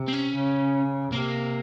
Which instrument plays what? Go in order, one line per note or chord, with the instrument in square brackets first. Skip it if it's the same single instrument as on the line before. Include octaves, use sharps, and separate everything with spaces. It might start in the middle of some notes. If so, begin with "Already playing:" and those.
Already playing: [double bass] C3
[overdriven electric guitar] C4
C#4
[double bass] C#3
[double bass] C3 [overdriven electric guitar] A#3